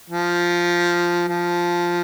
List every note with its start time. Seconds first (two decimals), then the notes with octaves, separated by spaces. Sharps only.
0.10 F3
1.29 F3